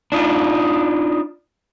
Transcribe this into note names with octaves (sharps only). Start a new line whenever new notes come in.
D4 D#4 F4